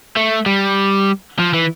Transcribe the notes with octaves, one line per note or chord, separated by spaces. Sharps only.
A3
G3
F3
E3